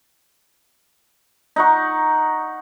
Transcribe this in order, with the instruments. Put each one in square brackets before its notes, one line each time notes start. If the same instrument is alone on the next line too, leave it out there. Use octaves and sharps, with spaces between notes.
[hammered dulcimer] D#4 F#5 C#6